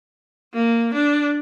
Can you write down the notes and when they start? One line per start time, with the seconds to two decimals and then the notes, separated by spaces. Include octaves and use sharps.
0.54 A#3
0.94 D4